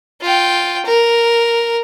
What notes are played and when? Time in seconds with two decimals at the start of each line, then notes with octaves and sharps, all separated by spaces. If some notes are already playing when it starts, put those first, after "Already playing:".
0.22 F4 G5
0.85 A#4